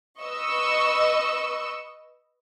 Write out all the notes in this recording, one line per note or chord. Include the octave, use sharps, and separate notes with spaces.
B4 D#5 C#6 E6